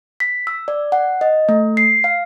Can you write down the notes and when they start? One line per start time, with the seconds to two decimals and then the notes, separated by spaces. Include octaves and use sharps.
0.20 B6
0.47 E6
0.68 D5
0.92 F#5
1.21 D#5
1.49 A3
1.77 C7
2.04 F5